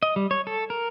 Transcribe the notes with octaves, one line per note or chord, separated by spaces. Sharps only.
D#5
G3
C#5
A4
A#4